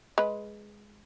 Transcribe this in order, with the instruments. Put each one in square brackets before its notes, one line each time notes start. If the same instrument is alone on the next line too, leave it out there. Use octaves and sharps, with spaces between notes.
[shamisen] G#3 B4